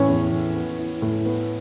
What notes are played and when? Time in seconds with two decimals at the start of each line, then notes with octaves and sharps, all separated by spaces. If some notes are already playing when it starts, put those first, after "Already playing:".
Already playing: A2 E3 C#4
0.08 E2
0.32 E2
0.55 B3
0.79 E4
1.02 A2
1.26 B3